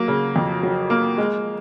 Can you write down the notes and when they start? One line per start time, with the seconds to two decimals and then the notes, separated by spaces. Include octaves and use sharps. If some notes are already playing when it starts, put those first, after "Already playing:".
Already playing: F#3 A#3
0.08 C#3
0.36 F2
0.63 F#3
0.90 A#3
1.18 G#3